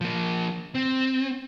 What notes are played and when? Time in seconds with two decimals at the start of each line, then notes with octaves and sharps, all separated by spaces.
0.01 F3 A#3
0.75 C4